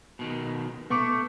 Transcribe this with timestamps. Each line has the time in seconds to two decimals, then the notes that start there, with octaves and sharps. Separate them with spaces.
0.19 B2 D#3
0.90 A3 B3 C#6 D6